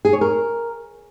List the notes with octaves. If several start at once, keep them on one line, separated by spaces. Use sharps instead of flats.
G#4
C#5
A#4